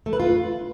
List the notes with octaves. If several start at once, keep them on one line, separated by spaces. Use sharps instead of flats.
A3
B4
F4